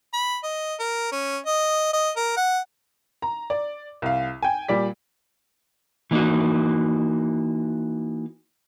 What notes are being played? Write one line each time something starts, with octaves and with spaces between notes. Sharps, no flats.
B5
D#5
A#4
C#4
D#5
D#5
A#4
F#5
A#5
D5
C2 F5
G5 G#5
A#2 G3 D5 B6
E3 A#3 C#4 D#4 F#4